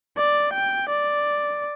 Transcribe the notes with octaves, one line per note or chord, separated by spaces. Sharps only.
D5
G5
D5